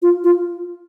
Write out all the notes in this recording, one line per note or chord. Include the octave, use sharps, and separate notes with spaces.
F4
F4